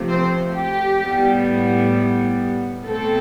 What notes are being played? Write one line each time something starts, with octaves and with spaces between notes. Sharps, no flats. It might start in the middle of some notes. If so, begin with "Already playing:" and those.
Already playing: C3 F3 A3
C4 C5
G4
A2 G3 B3
B2 A3 C4 A4